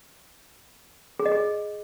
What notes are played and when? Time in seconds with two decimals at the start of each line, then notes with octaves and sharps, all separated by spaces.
1.19 G#4
1.26 D#5
1.32 G#4